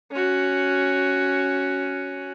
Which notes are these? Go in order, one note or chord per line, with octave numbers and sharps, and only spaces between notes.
C#4 F#4